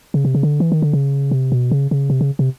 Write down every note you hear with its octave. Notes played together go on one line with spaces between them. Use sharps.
C#3
C3
C#3
D3
E3
D#3
D3
C#3
C3
B2
C#3
C#3
C3
C#3
C3